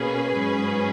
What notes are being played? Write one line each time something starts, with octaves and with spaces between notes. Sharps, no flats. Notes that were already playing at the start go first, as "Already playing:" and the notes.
Already playing: B2 A#3 C#4 G#4 B4
G#2 F#3 C#4